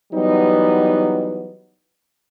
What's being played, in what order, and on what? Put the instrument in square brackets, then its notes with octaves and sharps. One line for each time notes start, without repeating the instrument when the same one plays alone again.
[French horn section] E3 F#3 G3 B3 D#4